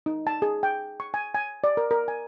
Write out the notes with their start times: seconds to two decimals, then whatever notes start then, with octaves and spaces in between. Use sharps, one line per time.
0.06 D#4
0.27 A5
0.42 G#4
0.63 G5
1.00 C#6
1.14 G#5
1.35 G#5
1.64 D5
1.77 A#4
1.91 A#4
2.08 G#5